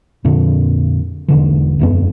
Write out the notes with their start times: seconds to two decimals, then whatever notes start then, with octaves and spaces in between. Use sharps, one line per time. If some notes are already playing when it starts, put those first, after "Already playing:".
0.25 F2 A#2 D3
1.28 E1 D3 E3
1.79 E1 F#2 B3